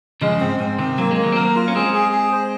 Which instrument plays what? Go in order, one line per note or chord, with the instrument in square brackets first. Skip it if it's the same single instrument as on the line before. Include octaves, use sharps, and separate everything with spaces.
[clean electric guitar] C#3 F3 [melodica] G#3
[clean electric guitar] F#2
[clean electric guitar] G#2 [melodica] C4
[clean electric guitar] G#2 [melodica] C4
[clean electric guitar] C3 D#3 [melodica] C4
[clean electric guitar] F#3 [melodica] A#3
[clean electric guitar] G#3
[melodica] A#3
[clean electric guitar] D#3 F#3
C4
[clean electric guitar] F#3 A#3 [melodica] A#4
[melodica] F4
[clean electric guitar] C#4
[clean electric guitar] G#3 C4 [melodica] G#4
[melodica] G#4
G#4
C5